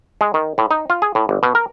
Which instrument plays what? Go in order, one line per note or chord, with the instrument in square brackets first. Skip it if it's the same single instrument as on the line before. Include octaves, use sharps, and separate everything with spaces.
[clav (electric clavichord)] G#3
D#3
A2
D#4
F4
G#4
A2
G1
B2
A#4